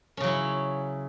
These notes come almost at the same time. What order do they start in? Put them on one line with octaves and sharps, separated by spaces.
C#4 C#3 F#3 E4